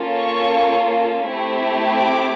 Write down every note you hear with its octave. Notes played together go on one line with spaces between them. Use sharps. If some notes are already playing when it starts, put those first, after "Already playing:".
Already playing: A#3 C#4 F4 A4
C#6
A3 C4 E4 G4
D6